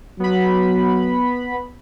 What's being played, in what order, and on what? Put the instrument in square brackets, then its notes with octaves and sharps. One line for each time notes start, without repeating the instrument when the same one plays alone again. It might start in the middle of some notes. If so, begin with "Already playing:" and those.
[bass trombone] F#3 [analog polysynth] B3 B5